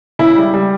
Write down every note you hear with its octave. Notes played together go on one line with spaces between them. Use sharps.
C#3 E4
G3
G3